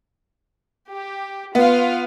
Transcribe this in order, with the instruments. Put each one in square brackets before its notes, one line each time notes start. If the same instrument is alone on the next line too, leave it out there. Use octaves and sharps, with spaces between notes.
[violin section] G4
[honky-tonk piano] B3 [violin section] F4 F5